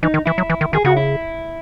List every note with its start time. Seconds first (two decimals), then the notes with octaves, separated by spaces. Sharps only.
0.03 E3 D#4
0.14 D#3
0.26 E3 E4
0.38 F#3
0.50 E3
0.61 D#3
0.73 D#3 G#4
0.85 C#3 F#4
0.97 E4